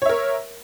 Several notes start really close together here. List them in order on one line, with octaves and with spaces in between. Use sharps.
C#5 E5 A#4